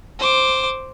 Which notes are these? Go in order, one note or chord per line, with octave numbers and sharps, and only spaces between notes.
C5 D6